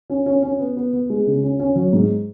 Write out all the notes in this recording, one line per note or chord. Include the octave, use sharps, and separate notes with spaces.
C#4
C#4
C#4
B3
B3
B3
G#3
C#3
C#4
C#4
F#3
G#2